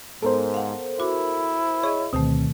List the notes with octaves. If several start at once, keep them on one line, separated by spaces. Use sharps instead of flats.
G#2 B3 A4 A#4 C5
F5 F#5
E4 F#4 D6
G#4 C#5 D#5
D2 B2 D#3 A3 C4